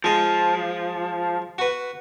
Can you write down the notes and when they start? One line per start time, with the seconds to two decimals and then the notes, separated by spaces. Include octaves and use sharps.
0.04 F3 G#3 D#5
1.58 F#4 B4